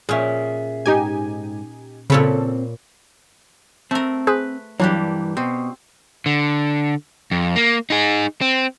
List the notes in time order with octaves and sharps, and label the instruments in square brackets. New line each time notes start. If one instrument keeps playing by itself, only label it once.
[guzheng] A#2 C#4 [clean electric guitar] G#4 E5
[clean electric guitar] G#2 [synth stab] D#4 G4 G#5
[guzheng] A#2 C#5 B5 [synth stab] C#3 A4 [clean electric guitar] C4
[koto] A3 A#4 [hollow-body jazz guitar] C4
[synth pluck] G#4 C5 [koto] B4
[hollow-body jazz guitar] G2 E3 [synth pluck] F#3 [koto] A#3 D4 G4
[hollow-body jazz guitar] B2 [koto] C4
[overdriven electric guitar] D3
F2
A#3
D#4 G#4
C4